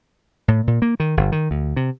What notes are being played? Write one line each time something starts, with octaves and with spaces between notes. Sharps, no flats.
A2
A#2
A#3
D#3
G1
D#3
D2
C3